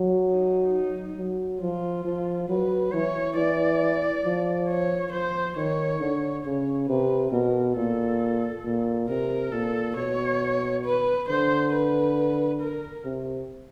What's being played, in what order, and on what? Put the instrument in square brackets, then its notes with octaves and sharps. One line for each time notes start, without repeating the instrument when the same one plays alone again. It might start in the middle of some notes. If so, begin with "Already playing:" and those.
Already playing: [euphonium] F#3
[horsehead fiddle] D#4
D#4
[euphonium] F#3
[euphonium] F3 [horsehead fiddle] F4
[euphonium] F3
[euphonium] F#3 [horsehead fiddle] B4
[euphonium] E3 [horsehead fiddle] C#5
[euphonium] E3 [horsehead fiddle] D5
[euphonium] F3
[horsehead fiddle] C#5
[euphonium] F3 [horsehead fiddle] C5
[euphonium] D#3 [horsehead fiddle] C#5
[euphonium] D3
[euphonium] C#3 [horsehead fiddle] C#5
[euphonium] C3 [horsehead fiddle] B4
[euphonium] B2 [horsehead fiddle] A#4
[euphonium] A#2 [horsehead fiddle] A4
[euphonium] A#2
[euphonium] C3 [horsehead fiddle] A#4
[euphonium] A#2 [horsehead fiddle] A4
[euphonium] B2 [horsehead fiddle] C#5
[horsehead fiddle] B4
[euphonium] D3 [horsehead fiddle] C5
[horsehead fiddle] B4
A#4
[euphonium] C3